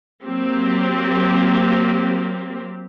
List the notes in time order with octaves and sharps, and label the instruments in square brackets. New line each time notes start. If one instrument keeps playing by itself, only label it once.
[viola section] F#3 A#3 C4 G4